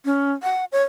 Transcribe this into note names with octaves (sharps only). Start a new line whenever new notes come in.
C#4
F#5
C#5